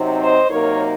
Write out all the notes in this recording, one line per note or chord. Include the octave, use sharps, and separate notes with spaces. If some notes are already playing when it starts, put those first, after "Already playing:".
Already playing: C3 F#3 C4 D#4
C5 D#5
C3 F#3 A#3 D#4 A#4 C#5